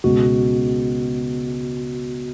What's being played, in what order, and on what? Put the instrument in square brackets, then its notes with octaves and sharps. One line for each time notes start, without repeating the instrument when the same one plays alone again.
[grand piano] C#2 B2 G#3 [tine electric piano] F#4